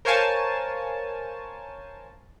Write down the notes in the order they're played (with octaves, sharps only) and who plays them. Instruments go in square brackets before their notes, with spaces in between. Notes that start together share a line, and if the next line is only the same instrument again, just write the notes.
[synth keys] A#4 C5 C#5 F5 G#5 A5